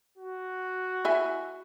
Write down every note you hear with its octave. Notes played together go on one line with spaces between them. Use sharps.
F#4
E4 E5 G#5